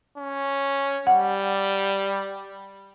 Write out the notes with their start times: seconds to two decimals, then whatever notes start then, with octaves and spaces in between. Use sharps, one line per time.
0.18 C#4
1.07 G3 F#5